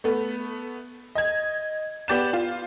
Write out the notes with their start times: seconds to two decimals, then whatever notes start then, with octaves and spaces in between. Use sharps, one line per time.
0.04 A3 B3
1.15 D#5 G#6
2.08 B3 G4 D5 G6 E7
2.33 F4